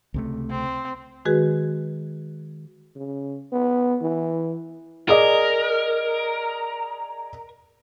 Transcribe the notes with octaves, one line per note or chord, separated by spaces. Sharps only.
C#2 C3 A3
C4
D#3 G#3 F#4 G#4 B4
C#3
B3
E3
G#4 A#4 D5 D#5